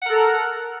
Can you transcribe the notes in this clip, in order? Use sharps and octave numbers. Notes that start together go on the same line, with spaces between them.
A4 A#4 F#5 A#5